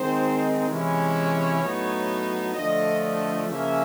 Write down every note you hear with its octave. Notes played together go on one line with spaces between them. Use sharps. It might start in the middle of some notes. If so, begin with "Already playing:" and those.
Already playing: D#3 G#3 C4 D#4 C5
C3 E3 G#3 C#4 E4 C#5
A2 F#3 B3 D#4
D3 F3 A3 D4 F4 D#5
D#5
C#3 F3 A#3 C#4 F4 E5